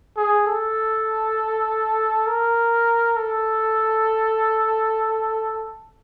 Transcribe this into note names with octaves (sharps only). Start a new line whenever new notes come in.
G#4
A4
A#4
A4